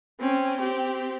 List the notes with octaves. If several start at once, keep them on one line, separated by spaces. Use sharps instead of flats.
C4 C#4
C4 G4